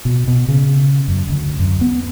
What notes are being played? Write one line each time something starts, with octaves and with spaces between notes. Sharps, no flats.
B2
B2
C#3
F#2
D2
F#2
B3